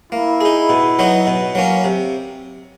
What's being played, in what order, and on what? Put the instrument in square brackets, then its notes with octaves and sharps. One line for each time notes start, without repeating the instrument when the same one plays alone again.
[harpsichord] A#3 [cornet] E4
[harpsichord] D#4 G#4
B2
F#3 B3 D#4 F#4
B2
F#3 A#3 C#4
C3